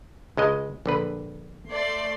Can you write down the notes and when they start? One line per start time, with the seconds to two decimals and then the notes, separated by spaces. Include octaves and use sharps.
0.37 C#2 G#3 D#5
0.86 A#1 D3 B4
1.70 A3 D5 C6